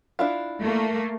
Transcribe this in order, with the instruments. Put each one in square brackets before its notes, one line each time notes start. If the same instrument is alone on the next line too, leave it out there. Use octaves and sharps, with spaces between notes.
[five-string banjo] D4 E4 F4
[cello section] A3 A#3